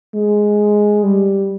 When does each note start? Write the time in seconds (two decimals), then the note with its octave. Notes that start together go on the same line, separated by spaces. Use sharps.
0.15 G#3
1.04 G3